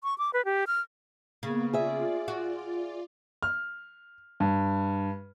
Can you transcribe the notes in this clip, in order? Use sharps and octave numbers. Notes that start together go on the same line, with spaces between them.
C#6
D6
B4
G4
F6
C#3 A#3 B3
F4 G#4 D5 E5
F#4
F6
G2